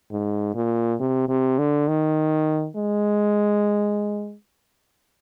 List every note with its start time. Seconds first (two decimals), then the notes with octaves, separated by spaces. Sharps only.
0.11 G#2
0.55 A#2
1.00 C3
1.29 C3
1.58 D3
1.88 D#3
2.76 G#3